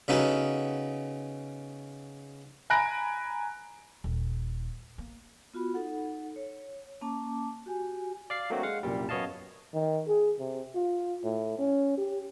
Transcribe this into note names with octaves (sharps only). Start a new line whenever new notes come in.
C#3 B3 C#4 D#4 F#4 A4
G#5 A#5 B5 F#6 A#6 D7
D#1
A#3
B3 F4 F#4 B5
D#4 A4 F#5
C#5
A#3 C#4 A5 D6
F#4 G4 G#5
D5 F5 C7
F#3 A3 A#3 C4 D4 F#4
G#3 F5 F#5
C2 F#2 A#2 G3
F#2 B3 C#5 D#5 F5 A5
D#3
G#4
C3
F4
A2
C#4
G4